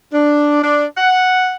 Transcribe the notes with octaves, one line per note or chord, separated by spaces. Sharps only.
D4
D4
F#5